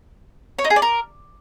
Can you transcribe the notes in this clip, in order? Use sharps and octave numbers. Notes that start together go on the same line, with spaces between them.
C#5
D#4
G#4
D5
A#4